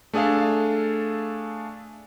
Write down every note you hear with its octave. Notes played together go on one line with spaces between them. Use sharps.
A3 D4 G#4 A4 F5